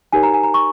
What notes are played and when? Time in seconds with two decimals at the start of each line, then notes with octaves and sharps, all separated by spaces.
0.12 D#4 G4 A#4 C#5 G#5
0.23 A#5
0.34 G#5
0.43 A#5
0.54 C#6